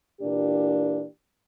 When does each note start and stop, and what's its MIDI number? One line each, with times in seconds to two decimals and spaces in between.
0.21 1.05 46
0.21 1.05 52
0.21 1.05 58
0.21 1.05 62
0.21 1.05 67